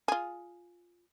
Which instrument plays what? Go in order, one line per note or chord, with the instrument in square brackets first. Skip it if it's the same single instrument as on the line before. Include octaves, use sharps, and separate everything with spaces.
[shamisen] F4 G#4